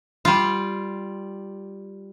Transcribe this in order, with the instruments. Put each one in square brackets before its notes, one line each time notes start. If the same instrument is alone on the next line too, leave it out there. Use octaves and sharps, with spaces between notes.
[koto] G3 F4